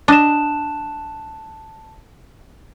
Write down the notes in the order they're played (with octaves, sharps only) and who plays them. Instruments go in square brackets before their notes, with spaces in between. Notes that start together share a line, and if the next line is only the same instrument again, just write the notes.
[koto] D4 D#5 [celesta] A5 F#6 E7